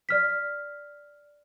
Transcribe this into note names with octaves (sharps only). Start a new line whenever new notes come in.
D5 F6 B6